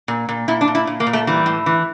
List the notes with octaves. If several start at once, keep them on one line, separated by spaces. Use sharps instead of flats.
A#2
A#2
A#2 E4
D4
A#2
E4
A#2
A#3
A#2
A3
E3 G3
A2
E3